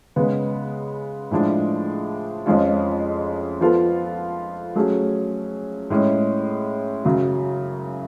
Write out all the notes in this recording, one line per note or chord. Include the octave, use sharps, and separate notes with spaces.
C#3 G#3 B3
A2 F3 G#3 D4
F2 F3 G#3 C#4 F4
F3 B3 F4 A4
F#3 A3 C#4 G#4
A2 G#3 C#4
F#2 C#3 F#3